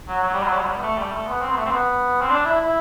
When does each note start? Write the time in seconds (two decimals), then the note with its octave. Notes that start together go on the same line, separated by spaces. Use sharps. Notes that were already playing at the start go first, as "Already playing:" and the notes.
0.08 F#3
0.23 F#3
0.33 G3
0.43 F#3
0.53 G3
0.61 F#3
0.68 G3
0.77 B3
0.82 A3
0.98 G3
1.12 A3
1.27 B3
1.42 C4
1.52 B3
1.57 A3
1.66 C4
1.71 B3
2.21 C4
2.30 D4
2.45 E4
2.60 E4